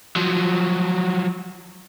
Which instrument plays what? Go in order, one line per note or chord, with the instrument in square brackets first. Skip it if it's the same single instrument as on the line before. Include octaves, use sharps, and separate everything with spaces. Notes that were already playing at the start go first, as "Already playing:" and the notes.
[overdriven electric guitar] F3 F#3